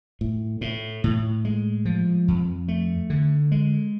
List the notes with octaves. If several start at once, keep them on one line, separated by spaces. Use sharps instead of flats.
A2
A2
A2
G#3
F3
F2
A3
D3
G#3